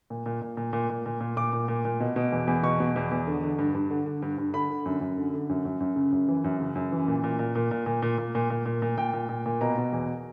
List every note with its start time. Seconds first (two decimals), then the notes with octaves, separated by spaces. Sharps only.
0.10 A#2
0.26 A#2
0.42 A#2
0.57 A#2
0.73 A#2
0.90 A#2
1.06 A#2
1.20 A#2
1.37 A#2 D6
1.53 A#2
1.68 A#2
1.85 A#2
2.00 B2
2.16 B2
2.32 E2
2.47 E2
2.63 B2 C#6
2.80 B2
2.96 E2
3.11 E2
3.27 D3
3.43 D3
3.59 G2
3.75 G2
3.90 D3
4.06 D3
4.22 G2
4.38 G2
4.54 D3 B5
4.70 D3
4.86 F#2
5.01 F#2
5.17 D3
5.34 D3
5.49 F#2
5.65 F#2
5.80 F#2
5.96 C#3
6.12 F#2
6.28 E3
6.44 F#2
6.60 C#3
6.75 F#2
6.92 E3
7.08 A#2
7.24 A#2
7.39 A#2
7.55 A#2
7.71 A#2
7.86 A#2
8.02 A#2
8.18 A#2
8.35 A#2
8.50 A#2
8.66 A#2
8.82 A#2
8.98 A#2 G5
9.13 A#2
9.29 A#2
9.46 A#2
9.61 B2 A#5
9.78 B2
9.92 E2